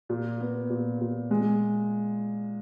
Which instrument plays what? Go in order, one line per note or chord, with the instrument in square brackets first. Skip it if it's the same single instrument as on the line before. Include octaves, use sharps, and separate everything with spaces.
[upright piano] A#2
B3
A#2
A#2
G#3